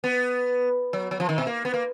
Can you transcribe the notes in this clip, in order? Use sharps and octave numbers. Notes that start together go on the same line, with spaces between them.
B3
F#3
F#3
F3
D#3
B2
A#3
B3
A#3